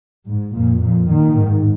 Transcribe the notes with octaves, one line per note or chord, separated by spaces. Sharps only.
G#2
F2 A#2
F2 A#2
A#2 D#3
G#2